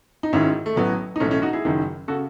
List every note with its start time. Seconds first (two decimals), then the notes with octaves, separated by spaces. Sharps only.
0.23 D#4
0.33 G#1 G#2 D#3 C#4 E4
0.66 A3
0.76 A1 A2 F#3 B3
1.16 D#4
1.20 B1 A2 E3 A3 C#4
1.31 A3 C#4
1.42 D#4 F#4
1.53 E4 G#4
1.65 F#1 F#2 D#3
2.08 C#3 F#4 A4